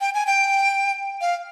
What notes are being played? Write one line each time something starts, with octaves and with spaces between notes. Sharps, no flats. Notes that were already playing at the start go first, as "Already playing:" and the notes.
G5
G#5
G5
F5